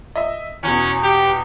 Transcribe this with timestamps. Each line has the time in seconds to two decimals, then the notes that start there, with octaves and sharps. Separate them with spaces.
0.16 D#5 E5
0.63 E2 B2 C#4
1.03 G4